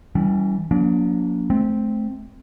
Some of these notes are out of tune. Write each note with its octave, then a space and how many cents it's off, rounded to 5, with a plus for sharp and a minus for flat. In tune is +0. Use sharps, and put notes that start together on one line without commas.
E3 -15 G3 -20 C#4 +25
F#3 -45 A#3 +20 D4 -35
A3 -30 C4 +0